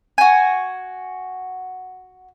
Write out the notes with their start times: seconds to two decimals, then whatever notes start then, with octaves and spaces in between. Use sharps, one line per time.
0.18 F#4 G#5